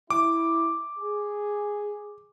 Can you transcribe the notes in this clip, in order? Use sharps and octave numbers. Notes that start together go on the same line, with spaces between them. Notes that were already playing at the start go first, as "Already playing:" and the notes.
E4 D6
G#4